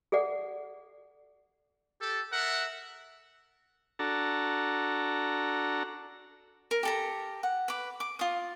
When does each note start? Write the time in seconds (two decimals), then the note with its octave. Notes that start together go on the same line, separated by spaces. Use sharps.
0.12 G#4 A4 D5 F#5
2.02 G4 A4
2.32 A#4 E5 F#5
3.99 D4 F#4 A4 A#5
6.71 A#4
6.83 G4 A4 A#5
7.43 F#5
7.68 B4 D6
8.00 D6
8.19 F4 D#6